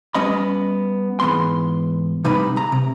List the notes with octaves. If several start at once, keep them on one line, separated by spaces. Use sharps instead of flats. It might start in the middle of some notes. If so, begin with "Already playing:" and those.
G3 B3 C#4 D#5 B5
G#2 E3 B3 C6
C3 G3 D#4 B4 B5
C2 A#5
C3